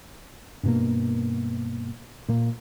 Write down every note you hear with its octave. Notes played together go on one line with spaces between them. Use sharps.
G2 B2 A#3
A#2 A#3